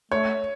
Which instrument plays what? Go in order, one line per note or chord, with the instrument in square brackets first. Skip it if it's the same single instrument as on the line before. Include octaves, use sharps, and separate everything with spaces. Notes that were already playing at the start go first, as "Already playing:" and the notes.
[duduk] A3 [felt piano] C#5